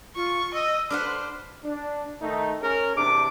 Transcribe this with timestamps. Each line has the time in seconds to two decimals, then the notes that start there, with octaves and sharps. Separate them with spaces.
0.16 F4 C#6
0.54 D#5 E6
0.90 D4 B4 C5 F#5 F6
1.64 D4
2.22 D#3 A3 D#4
2.61 C#4 G#4 A#4
2.97 E2 C3 D4 D6